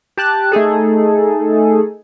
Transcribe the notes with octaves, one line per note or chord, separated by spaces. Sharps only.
G4 A5 F#6
A3 D#4 G#4 A4